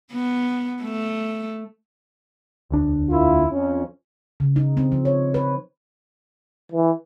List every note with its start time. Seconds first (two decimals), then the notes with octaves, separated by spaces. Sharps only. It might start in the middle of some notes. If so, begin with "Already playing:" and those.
0.12 B3
0.82 A3
2.70 E1 D2 D4
3.09 A#3 E4 F4
3.50 F2 C#4
4.40 C#3
4.56 D#4
4.77 C4
4.92 F3
5.05 C#5
5.34 B4
6.72 E3